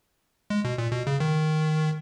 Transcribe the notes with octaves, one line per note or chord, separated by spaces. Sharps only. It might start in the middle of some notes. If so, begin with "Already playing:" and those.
G#3
B2
A#2
B2
C#3
D#3